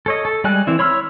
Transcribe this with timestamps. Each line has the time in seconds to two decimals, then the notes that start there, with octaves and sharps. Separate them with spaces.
0.06 A4 C#5 D#5
0.25 A4
0.44 G3 G#3 D5 G#5 F#6
0.67 E3 C4 E4
0.79 C#5 B5 C6 E6 F6